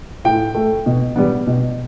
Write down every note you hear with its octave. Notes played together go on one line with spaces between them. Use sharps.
A2 G5
A3
B2
G3 B3
B2